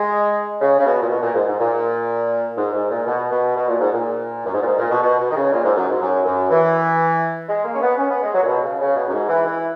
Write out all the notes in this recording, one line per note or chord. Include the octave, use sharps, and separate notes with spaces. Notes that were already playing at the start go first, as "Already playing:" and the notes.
Already playing: G#3
C#3
C#3
B2
A#2
B2
A#2
G#2
G#2
A#2
G#2
G#2
A#2
B2
B2
B2
A#2
G#2
A#2
F#2
G#2
A#2
G#2
A#2
B2
B2
B2
D#3
C#3
A#2
G#2
F#2
G#2
F#2
F#2
E3
G#3
A#3
C#4
B3
C#4
B3
G#3
F#3
A#2
B2
C#3
C#3
B2
F#2
G#2
E3
E3